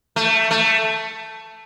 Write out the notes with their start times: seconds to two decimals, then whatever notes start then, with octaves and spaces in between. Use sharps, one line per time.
0.16 A3
0.51 A3